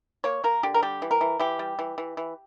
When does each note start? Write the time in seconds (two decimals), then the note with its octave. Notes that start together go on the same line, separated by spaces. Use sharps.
0.24 A#3 C#5
0.44 A#3 A#4
0.63 D3 G4
0.74 A#4
0.82 G3 G4
1.02 E3
1.11 A#4
1.21 E3
1.39 E3 G4
1.59 G3
1.79 E3
1.98 E3
2.17 E3